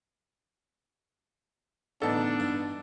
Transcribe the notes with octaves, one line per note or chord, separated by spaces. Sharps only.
A1 D3 B3 D4 D#4 A4
G2